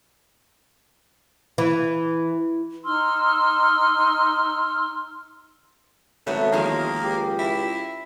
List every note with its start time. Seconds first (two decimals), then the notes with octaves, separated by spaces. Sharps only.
1.58 E3
2.85 D#4 C6 E6 F6
6.27 G#1 B2 F#3 A3 B3
6.52 E1 D#3 F3 G#3 A#3
7.04 C#2 G4
7.39 E4